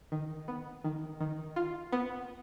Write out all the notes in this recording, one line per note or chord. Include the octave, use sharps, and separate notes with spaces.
D#3
B3
D#3
D#3
F4
B3